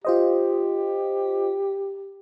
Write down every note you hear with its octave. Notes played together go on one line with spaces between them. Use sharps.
F4 G4 C5 D#5